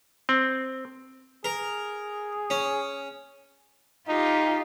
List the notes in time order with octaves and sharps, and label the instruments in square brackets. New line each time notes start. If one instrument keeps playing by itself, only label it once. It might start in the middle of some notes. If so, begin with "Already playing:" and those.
[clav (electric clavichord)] C4
[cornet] G#4 [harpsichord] A#4
[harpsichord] C#4
[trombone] D#4 [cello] F4 G4